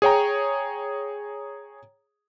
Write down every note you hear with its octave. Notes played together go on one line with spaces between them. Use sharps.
G#4 C#5 G5 A#5